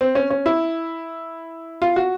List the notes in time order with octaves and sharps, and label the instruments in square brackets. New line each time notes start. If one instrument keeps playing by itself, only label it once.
[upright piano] C4
C#4
C#4
E4
F4
F#4